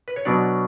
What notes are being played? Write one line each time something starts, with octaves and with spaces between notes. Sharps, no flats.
B4
C#5
B2 F#3 B3 D4 D5